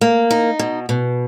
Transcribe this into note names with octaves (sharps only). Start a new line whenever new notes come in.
A#3
D#4
B2
B2